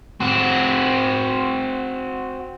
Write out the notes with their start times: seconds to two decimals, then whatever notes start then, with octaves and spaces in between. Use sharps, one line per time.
0.20 C4 F#4